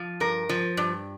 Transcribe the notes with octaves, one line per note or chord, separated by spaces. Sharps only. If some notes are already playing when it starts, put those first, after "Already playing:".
Already playing: F3
G2 A#4
F3
G2